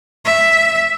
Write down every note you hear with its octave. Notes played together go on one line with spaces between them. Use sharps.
E5